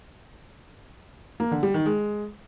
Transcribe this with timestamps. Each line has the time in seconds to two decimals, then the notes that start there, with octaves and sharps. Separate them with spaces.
1.40 A#3
1.51 D3
1.63 G3
1.74 D#3
1.86 G#3